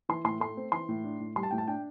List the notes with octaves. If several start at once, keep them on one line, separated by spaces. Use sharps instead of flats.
E3 C6
A2 C6
A3 C6
C4
E3 C6
A2
D4
A2
G3 C6
A5
A2 G5
A5
D4 G5